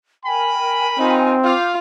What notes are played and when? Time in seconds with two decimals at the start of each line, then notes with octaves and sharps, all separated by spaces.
0.24 A#4 G5 G#5 B5
0.99 C4 D#4 F4
1.44 F4 F5 D6 G6